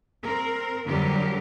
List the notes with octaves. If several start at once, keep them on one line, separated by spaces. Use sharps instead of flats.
C4 A#4
F2 D3 F#3 G3 G4 A#4